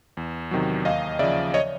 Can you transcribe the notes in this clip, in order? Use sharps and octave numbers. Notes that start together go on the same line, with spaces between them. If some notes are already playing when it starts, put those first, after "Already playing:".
E2
C3 D#3 F#3
D#2 D#5 F5
C#3 F3 D5 E5
C#5 D#5